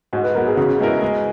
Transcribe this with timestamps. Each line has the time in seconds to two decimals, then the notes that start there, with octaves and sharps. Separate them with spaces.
0.13 G#2 F#4
0.24 B4
0.35 F#3 B3 A#4
0.47 G#4
0.57 C#3 F#4
0.80 G#3 B3 E4 A#4
1.02 G#3